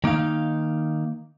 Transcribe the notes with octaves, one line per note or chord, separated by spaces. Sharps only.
D#3 A#3 D#4 F5